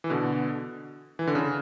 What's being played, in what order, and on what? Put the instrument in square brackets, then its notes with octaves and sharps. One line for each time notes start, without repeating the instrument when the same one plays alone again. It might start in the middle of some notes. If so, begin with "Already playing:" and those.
[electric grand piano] E3
B2 D3
E3
D3
C#3